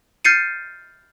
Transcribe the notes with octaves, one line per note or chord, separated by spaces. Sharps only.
F6 G6 A6 C7 C#7 D#7